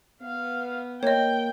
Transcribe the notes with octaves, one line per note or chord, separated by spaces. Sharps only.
B3 F5
A#3 C#5 D#5 G5